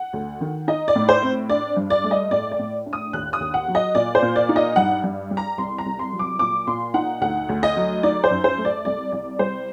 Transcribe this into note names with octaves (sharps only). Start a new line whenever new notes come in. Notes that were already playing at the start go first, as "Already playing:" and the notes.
Already playing: F#5
D2
D#3
D#4 D#5
D5
A2
C5
C4
D4 D5
G2
D5
A3
D#5
A2 D5
D5
A2
D4
D#6
D#2 F#6
D#6
D#2
F#5
F#3
D#5
A#2 D5
C5
A#2
D5
D#4
D#5
G2 F#5
G2
G3
A#5
C2 C6
A#5
C2
C6
F#3
D6
A#2 D6
A#2 C6
D#4 F#5
D2 F#5
D2
D#5
F#3
D#4 D5
C5
F#2
C5
A3
D5
C2 D5
C2 D5
G3 C5